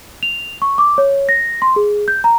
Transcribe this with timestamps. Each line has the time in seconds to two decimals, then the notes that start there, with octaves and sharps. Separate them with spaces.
0.23 F7
0.62 C#6
0.78 D6
0.98 C#5
1.29 A#6
1.62 C6
1.76 G#4
2.08 G6
2.24 A#5